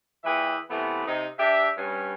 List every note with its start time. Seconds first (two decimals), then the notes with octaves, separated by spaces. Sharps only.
0.25 A#2 E3 G#4 B4 E5 G5
0.70 C3 E3 A3 B3
1.07 C3 D#4
1.39 D4 G4 E5
1.77 G2 C#4